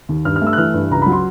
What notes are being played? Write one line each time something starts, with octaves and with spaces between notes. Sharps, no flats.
D#2
G2 F6
F6
A3
E6
F#6
E3 F6
G2
C#2 A#5
F#3 B5
C6